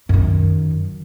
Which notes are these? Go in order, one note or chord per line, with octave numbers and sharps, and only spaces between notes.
F#2 D#3